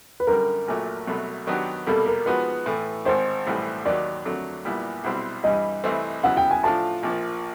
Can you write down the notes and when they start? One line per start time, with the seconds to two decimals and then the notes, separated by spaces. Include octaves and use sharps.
0.20 B4
0.27 F#2 D3 G3 A#4
0.68 A#1 A#2 F#3 A3
1.07 C2 B2 F#3 A3
1.47 D#3 F#3 B3 D4 G4
1.86 C2 B2 G3 A#3 A4
2.07 A#4
2.26 F3 G#3 B3 D#4 F#4 B4
2.66 A2 E3 A3
3.05 G#1 G#2 D#3 C5
3.46 B1 A2 E3 G3
3.85 D#2 D#3 F#3 D5
4.25 F2 D3 F#3 A3
4.65 A#1 A#2 G3 B3 E4
5.04 B1 B2 G3 C4 E4
5.44 G2 E3 G3 D#5
5.84 C2 C3 E3 A3 C4
6.23 C#3 F#3 B3 E4 F#5
6.37 G5
6.51 G#5
6.63 A2 F3 A3 D4 F4 A5
7.03 A#1 A#2 F3 A#3